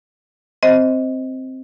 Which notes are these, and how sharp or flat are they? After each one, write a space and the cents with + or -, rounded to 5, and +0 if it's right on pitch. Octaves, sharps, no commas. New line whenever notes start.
C4 +0 C5 +0 D#5 +20